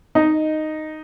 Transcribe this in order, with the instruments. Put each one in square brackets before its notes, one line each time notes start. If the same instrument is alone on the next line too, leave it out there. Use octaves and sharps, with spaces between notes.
[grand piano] D#4 D#5